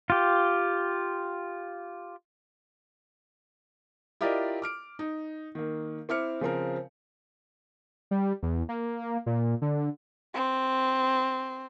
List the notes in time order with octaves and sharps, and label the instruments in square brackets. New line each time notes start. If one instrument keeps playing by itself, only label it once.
[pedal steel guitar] F4 G4
[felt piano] E4 F4 G4 A#4 D5 D#5
D6 F6 D7
D#4
D#3 A#3
C4 E4 D6 F6 C#7
C#3 F3 C4 A#4
[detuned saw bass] G3
E2
A#3
A#2
D3
[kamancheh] C4